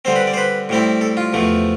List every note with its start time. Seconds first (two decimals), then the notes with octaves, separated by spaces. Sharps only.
0.05 D3 G3 C4 C5
0.16 B4
0.27 D5
0.34 C5
0.37 B4
0.69 A2 G3 C4 E4
1.01 A4
1.17 F4
1.33 E2 C3 F3 A3